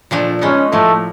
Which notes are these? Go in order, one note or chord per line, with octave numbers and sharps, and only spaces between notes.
A#2 F3 A3 D4
G#3 B3 C#4 D#4
A2 F3 A3 A#3